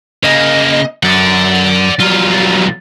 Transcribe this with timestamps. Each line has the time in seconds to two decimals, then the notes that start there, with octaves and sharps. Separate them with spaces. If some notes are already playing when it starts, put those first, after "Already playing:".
0.24 C#3 A#3 D#5
1.03 F#2 D5 F#5
2.00 B1 F#3 G3 F4